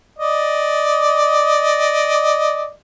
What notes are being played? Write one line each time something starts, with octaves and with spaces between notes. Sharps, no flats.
D5 D#5